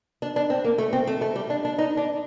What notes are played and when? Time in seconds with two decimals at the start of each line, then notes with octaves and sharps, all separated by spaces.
0.22 D4
0.36 D4
0.50 C4
0.65 A#3
0.78 A3
0.93 C4
1.07 A3
1.21 A3
1.36 G3
1.50 D4
1.65 D4
1.78 D#4
1.97 D4